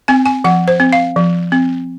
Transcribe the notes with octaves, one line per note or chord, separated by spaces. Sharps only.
C4 G#5
G#5
F3 F#5
C5
C4
F5
F3
C4